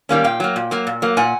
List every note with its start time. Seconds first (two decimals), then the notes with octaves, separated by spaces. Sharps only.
0.09 D#3 G3 A#3 C#4
0.24 A#2 F5 G5
0.40 F#3 A#3
0.56 A#2
0.71 F#3 A#3
0.87 A#2
1.02 F#3 A#3
1.17 A#2 F#5 G#5